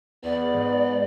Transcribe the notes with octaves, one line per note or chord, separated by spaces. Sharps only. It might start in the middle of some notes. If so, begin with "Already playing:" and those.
E2 B3 D5
G#2